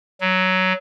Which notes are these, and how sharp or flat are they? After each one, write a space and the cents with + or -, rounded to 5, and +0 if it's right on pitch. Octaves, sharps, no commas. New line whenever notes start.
F#3 +10